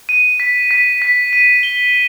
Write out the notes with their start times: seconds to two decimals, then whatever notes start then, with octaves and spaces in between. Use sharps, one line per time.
0.09 D#7
0.40 B6
0.71 B6
1.02 B6
1.33 D#7
1.63 G7